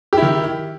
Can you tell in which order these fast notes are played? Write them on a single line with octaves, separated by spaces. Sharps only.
G4 E4 D#3